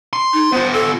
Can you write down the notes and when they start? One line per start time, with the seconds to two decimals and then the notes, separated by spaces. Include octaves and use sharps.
0.13 C6
0.33 D#4
0.52 B3 F4 C5
0.73 A4